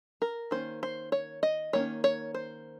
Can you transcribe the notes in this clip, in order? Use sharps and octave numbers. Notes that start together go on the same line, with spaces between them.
A#4
D#3 A#3 C#4 C5
C5
C#5
D#5
D#3 A#3 C#4 C#5
C#5
C5